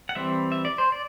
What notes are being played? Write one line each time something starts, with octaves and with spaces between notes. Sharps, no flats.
F#5
E3 G3 C4 E5
E5
D5
C5
D5